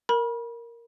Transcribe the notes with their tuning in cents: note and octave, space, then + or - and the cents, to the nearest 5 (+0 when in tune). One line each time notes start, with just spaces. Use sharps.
A#4 +0 B5 -35